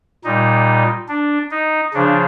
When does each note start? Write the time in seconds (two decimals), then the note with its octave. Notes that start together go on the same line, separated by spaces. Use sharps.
0.24 A#2 G3 D#4
1.09 D4
1.51 D#4
1.94 C#3 F3 D4